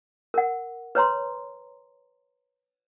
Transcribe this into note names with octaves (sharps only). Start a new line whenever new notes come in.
A#4 F#5
B4 C#5 A#5 C6